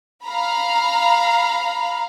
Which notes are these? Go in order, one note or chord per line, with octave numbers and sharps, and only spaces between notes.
F5 A#5 B5